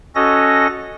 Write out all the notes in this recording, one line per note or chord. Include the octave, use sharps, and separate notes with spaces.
C#4 F#4 A4 D#5 A#6